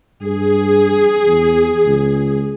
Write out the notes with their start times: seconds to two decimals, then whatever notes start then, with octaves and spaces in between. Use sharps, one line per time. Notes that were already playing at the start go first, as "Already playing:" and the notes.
0.22 G2 G#4
1.27 E2
1.85 C#2